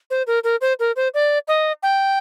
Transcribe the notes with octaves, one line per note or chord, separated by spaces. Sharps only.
C5
A#4
A#4
C5
A#4
C5
D5
D#5
G5